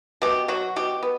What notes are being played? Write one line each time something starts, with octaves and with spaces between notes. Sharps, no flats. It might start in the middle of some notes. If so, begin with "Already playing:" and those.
B2 G4
F#3 F#4
B2 G4
B3